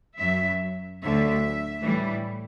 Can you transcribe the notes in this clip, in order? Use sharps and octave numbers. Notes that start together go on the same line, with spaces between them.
F#2 F#3 E5
D2 D3 F#3 E5
A2 E3 G3